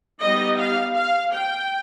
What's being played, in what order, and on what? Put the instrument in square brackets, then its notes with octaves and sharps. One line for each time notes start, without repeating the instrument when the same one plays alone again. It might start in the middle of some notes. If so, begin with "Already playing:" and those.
[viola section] G3 B3 D#4 D#5
F5
F5
G5